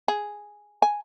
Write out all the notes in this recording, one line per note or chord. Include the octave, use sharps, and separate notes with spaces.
G#4
G#5